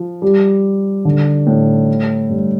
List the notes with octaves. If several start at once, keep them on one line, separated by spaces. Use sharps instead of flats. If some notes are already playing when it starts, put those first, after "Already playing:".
Already playing: F3
G3
D3
A2
G2